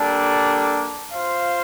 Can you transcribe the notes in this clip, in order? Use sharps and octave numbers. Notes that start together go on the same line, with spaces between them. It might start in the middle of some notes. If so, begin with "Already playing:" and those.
Already playing: G3 A#3 D4 A4
F4 C5 F5